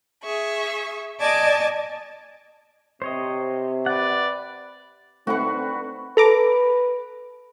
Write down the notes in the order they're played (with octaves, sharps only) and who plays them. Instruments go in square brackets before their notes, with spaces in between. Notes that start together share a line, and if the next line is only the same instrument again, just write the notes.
[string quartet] G#4 E5 C#6
D5 D#5 G#5 A5 D6
[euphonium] C3 [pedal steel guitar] C5 C#5 D#5
[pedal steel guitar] B4 F#5 [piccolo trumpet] D5
[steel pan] A3 D#4 F#5 [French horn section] C4 D4 [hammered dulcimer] F#4 B4
[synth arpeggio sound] A4 A#5 D6 [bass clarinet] B4